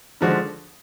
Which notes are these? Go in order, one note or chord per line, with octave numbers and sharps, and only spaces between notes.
D3 F3 G#3 D4 F#4